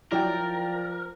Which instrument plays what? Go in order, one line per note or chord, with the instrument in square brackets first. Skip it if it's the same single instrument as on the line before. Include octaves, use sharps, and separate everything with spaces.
[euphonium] F3 [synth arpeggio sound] F#3 E4 [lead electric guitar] A#4 [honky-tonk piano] D5 G5